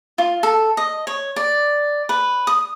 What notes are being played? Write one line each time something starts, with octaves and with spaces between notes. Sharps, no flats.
F4
A4
D#5
C#5
D5
B4
D#6